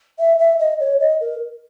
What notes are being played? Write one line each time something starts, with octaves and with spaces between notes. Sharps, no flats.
E5
E5
D#5
C#5
D#5
A#4